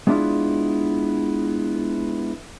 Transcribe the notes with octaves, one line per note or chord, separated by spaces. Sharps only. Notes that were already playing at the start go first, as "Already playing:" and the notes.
G#3 B3 D4 E4 F4 G#4